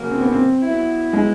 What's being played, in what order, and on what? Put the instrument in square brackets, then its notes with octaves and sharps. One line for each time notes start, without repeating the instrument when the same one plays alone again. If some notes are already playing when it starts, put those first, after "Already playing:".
Already playing: [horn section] C#3 F#3 A#3
[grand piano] C4
B3
C4
[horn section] F#3 B3 E4
[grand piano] G#3